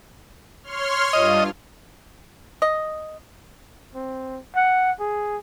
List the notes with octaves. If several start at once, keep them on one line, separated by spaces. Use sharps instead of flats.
C#5 C6 F6
G2 F4 D#5
D#5
C4
F#5
G#4